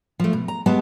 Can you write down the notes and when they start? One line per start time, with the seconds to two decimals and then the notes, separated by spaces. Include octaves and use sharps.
0.20 F3 A3
0.33 B2
0.48 A#5
0.66 G#3 B3 G4 A5